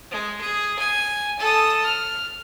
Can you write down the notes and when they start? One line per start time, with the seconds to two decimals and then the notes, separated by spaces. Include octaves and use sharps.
0.11 G#3
0.41 G#4
0.79 G#5
1.39 A4 D#6
1.84 F6